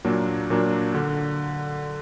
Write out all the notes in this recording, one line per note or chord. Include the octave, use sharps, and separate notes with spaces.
A#2 F#3 A#3 D4
A#2 F#3 A#3 D4
D3